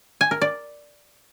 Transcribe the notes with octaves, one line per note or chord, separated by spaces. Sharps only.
G#5
A#4
D5